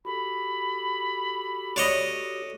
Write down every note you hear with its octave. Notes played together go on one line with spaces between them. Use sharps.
F#4 G4 A4 B5
D4 C#5 D#5